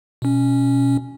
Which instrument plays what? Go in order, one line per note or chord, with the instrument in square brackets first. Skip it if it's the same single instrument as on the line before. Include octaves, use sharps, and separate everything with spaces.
[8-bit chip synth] B2 C#4